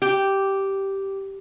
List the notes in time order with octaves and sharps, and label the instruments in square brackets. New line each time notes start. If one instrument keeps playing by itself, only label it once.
[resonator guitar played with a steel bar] G4